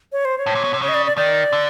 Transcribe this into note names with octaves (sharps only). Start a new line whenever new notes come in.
C#5
C5
C#5
A2
A#2
B2
C3
C#3 C#5
D#5
D5
D5
D#3 D5
D3